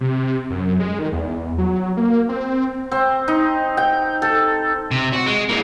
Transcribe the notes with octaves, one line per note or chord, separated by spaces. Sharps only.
C3
F#2
G#3
D#3
E2
F#3
A#3
C4
C4
D#4
G5
A4
C3
F#4
G#3
E3 A#3